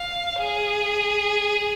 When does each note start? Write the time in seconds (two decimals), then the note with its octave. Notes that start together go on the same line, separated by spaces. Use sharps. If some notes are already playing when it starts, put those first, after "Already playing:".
Already playing: F5
0.39 G#4